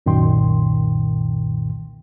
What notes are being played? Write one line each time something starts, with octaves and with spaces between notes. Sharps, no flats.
C2 F#2 A#2 D#3 G5 C6